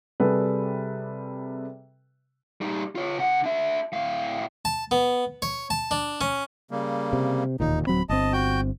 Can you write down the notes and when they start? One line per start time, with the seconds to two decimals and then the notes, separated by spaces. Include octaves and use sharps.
0.20 C3 G3 G#4 A4 B4
2.61 G3 D#4
2.95 F4 C#5
3.18 C#3 F#5
3.44 D4 E5
3.93 A2 F5
4.65 A5
4.91 B3
5.42 C#5
5.70 A5
5.91 D4
6.21 C#4
6.71 C#3 G3 A#3
7.13 C3
7.60 E1 D#2 A#2 D#4
7.87 D1 F#3 C4 B5
8.09 G1 C4 D#5 A5
8.33 F#4 G5 G6